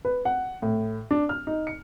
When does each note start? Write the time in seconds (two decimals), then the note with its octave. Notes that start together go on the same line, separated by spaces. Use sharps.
0.05 B4
0.25 F#5
0.62 A2
1.11 D4
1.29 F6
1.47 D#4
1.67 C#7